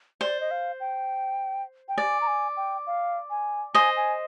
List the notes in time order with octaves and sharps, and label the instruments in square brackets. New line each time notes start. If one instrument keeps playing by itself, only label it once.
[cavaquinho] C5 [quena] D5
[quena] D#5
F5
G5
G5
[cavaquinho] D5 [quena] G#5
[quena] A#5
G#5
G5
F5
G#5
[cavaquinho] C5 D#5 [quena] G#5
[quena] G#5